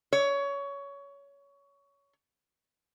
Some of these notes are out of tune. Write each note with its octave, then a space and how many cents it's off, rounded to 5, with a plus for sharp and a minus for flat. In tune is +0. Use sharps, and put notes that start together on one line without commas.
C#5 +20